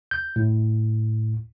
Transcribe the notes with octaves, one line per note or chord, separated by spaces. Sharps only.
G6
A2